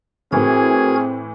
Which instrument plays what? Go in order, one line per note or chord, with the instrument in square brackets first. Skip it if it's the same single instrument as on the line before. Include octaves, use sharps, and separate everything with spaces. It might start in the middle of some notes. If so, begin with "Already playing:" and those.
[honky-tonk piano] A2 E3 [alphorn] C4 [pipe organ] F#4 A#4 G#6 [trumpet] G#4